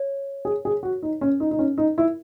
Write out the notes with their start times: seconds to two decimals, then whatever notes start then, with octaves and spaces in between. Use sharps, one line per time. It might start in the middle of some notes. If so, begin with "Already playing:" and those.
Already playing: C#5
0.45 G#4
0.65 G#4
0.83 F#4
1.03 D#4
1.21 C#4
1.40 D#4
1.51 D#4
1.59 C#4
1.78 D#4
1.98 E4